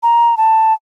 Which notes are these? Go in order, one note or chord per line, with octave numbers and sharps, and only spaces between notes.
A#5
A5